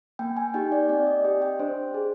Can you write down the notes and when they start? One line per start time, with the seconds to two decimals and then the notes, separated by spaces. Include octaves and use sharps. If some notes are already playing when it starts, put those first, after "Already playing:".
0.19 A#3 G5
0.37 G#5
0.54 D#4 G4 G5
0.72 D5
0.89 C4 D5
1.07 D#5
1.24 G4 G5
1.42 G5
1.59 D4 C5
1.94 G#4